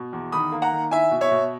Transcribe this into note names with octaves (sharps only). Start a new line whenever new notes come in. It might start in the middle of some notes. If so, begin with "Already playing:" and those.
Already playing: B2
E2
D#3 B5 D#6
A#3
F#5 A#5
D#3
E4 E5 G#5
B2
C#5 E5
B2